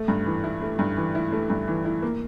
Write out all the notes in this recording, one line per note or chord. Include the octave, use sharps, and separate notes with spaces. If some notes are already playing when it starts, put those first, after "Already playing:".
Already playing: A3
G2
E3
E4
A3
G2
E3
E4
A3
G2
E3
E4
A#3